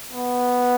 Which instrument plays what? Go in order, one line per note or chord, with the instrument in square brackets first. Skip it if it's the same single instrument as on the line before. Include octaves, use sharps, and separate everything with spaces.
[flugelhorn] B3